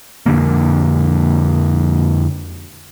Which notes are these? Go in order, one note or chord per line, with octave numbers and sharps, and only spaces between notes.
F2 D3 A#3